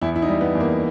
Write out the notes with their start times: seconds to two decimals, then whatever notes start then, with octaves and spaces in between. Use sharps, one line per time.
0.02 E2 E4
0.16 E4
0.22 D#4
0.28 G3
0.41 B3
0.55 E2
0.60 A#3